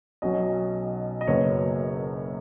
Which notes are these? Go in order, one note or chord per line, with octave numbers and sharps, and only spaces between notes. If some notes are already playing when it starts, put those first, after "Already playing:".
B1 B2 F#3 C#4 D#5
D#5
F#1 F#2 F#3 B3 C#5